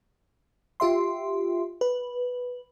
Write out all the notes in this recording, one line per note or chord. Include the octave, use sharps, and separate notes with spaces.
F4 G4 E5 C6
B4